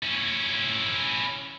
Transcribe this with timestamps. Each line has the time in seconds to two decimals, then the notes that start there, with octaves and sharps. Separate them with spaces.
0.03 C#4 E4